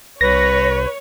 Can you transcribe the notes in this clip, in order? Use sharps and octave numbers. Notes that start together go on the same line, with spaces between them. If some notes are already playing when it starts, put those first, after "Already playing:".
C2 B4 C#5 A#6